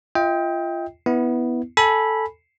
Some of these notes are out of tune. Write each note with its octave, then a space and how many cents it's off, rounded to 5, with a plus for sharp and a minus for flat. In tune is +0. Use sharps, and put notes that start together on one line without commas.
F4 -25 D#5 +40 G5 +10
B3 +0 E4 -15
A4 +0 G#5 +0 B5 -15